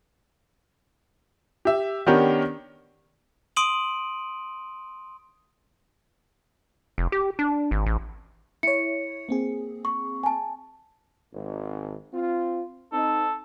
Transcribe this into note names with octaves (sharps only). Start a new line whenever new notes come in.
G4 E5
D#3 B3 C#4 D4 G4 A#4
C6 D#6 D7 D#7 F#7
F1
G4
D4
G#1
A1
E4 C#5 C#7
A#3 C4 G#4
C#6
G#5 A5
G#1
C4 F4
C4 D#4 A4